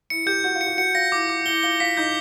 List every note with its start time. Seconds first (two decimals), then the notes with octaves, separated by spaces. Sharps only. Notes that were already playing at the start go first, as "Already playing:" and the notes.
0.10 E4 C#7
0.26 G4 G6
0.44 F#4 G6
0.55 F4
0.61 C#7
0.66 F#4
0.78 F#4 C#7
0.95 F4 A#6
1.12 E4 D6
1.30 D6
1.46 E4 G7
1.63 F4 G7
1.80 F4 B6
1.97 D#4 G6